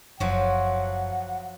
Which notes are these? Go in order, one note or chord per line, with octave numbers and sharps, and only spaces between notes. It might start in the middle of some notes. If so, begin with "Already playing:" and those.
F#1 F3 F#3 F#4 F#5